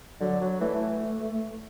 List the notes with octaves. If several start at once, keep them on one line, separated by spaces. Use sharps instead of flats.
D3 F#3
F#3
E3 A3
E3